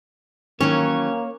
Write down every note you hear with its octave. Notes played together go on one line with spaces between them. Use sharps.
D#3 E3 F#3 A#3 C#4 C#5